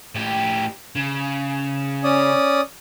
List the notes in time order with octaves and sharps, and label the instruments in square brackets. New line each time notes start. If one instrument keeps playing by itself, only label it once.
[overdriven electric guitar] A2 G4
C#3
[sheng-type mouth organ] C#4 D5 D#6